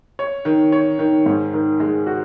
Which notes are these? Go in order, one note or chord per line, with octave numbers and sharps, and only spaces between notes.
C#5
D#3
C#5
D#3
G#2
D#3
G#3
F#4